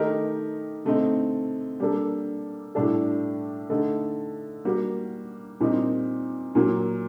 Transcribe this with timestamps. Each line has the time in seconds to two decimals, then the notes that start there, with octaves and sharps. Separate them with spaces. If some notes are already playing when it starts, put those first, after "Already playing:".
Already playing: D#3 A3 D#4 G4 A#4
0.85 D3 A3 C4 D#4
1.80 G3 A#3 D4 A4
2.75 A2 G3 D4 A4
3.70 D3 A3 D#4 A4
4.65 G3 A#3 F#4
5.60 A#2 G3 C4 D#4
6.55 A#2 F#3 A#3